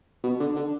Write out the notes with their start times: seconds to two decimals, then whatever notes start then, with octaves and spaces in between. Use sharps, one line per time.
0.24 B2
0.40 D3
0.56 D3